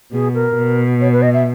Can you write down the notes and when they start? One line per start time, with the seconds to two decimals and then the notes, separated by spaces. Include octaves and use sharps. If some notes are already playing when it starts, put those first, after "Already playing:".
0.13 B2 G#4
0.34 A#4
0.57 B2
1.01 C#5
1.12 B4
1.22 D#5
1.34 E5